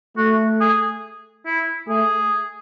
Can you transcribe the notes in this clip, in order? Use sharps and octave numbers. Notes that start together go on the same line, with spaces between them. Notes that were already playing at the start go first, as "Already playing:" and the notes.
A3 F#4
G#4
E4
A3 G#4